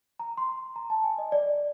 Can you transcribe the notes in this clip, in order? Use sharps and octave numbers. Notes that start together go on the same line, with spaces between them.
A#5
C6
A#5
A5
G#5
D#5
D5